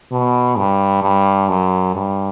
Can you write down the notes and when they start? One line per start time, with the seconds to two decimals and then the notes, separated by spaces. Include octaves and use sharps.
0.11 B2
0.57 G2
1.02 G2
1.49 F#2
1.94 G2